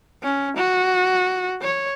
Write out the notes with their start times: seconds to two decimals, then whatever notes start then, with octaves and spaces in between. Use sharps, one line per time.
0.23 C#4
0.57 F#4
1.62 C#5